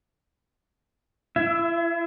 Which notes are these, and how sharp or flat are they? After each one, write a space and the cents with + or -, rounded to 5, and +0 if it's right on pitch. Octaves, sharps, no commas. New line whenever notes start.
E4 +40 E5 +0